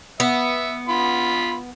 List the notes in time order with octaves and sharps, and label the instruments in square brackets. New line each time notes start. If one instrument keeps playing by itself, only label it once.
[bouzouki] B3 [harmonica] E5
[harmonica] F4 B5